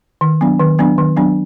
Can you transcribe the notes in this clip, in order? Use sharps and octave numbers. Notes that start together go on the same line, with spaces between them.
D#3
F#3 B3 D4
D#3
F#3 B3 D4
D#3
F#3 B3 D4